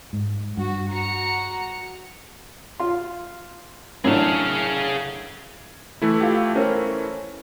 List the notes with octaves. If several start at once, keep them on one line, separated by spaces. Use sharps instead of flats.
G#2
G2 F#4
F#4 A#5 C#7
F4 C6
F#2 A2 D4 G#4 F5
E3 A3 E4
F4 G4
C#4 A#4 C5